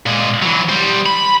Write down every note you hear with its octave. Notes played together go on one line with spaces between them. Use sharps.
A#2 G#3
E3 F#3
G3 C5
B5